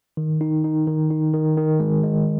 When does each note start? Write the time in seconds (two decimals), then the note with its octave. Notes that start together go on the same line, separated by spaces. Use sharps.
0.17 D#3
0.41 D#4
0.64 D#4
0.87 D#3
1.10 D#4
1.33 D#3
1.57 D#3
1.80 G#3
2.03 G#3